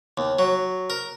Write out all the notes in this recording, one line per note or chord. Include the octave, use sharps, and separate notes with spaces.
D#2
F#3
A#4